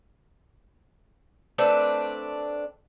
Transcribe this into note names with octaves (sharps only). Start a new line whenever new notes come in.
A3 C4 D4 B4